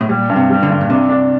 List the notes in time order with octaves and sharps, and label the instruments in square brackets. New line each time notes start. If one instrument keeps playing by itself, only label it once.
[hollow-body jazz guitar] A2
[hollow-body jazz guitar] A#2 [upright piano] G3
[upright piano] G2
[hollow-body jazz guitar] C3
[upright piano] G3
[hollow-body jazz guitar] D3
[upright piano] G2
[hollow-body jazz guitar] A#2
[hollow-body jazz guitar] C3 [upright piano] D4
[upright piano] D4